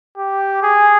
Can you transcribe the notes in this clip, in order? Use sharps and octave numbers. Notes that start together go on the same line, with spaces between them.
G4
G#4